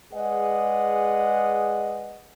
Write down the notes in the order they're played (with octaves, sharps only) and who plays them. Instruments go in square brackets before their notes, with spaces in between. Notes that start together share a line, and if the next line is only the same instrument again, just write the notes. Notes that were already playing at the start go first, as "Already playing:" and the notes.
[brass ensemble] G#3 G#4 B4 D5 D#5 F#5